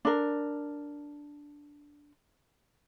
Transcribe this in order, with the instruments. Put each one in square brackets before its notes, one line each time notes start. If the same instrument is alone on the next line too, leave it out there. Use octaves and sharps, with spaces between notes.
[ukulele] D4 A#4